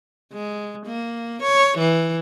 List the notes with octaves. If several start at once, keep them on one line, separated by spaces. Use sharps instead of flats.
G#3
A#3
C#5
E3